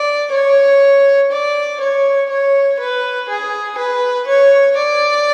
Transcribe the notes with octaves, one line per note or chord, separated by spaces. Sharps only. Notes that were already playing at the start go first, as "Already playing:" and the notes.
Already playing: D5
C#5
D5
C#5
C#5
B4
G#4
B4
C#5
D5